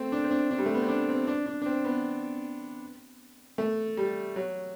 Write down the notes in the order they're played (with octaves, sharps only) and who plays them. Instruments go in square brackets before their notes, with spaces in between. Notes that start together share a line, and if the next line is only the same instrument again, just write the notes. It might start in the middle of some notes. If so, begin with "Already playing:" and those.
Already playing: [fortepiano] A3 C4
D4
C4
D4
D4
G3
A3
B3
C4
D4
C4
D4
D4
D4
C4
B3
A3
G3
F#3